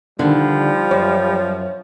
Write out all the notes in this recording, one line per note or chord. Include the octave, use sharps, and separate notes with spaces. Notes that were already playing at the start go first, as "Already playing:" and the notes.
D3 D#3 F3 G3
F#2 C#5